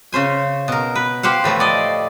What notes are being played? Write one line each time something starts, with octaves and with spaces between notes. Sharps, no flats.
C#3 C#4 C5 G#5
B2 A#4
B4
G4 C5 F5 F#5
A2 E3 F3 A3
D5 D#5